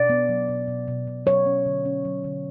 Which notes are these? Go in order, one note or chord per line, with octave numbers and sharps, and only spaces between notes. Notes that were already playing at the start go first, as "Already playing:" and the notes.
Already playing: B2 D5
B3
F#3
B2
B2
B2
B2
F#3 C#5
C#4
D3
C#4
F#3
D3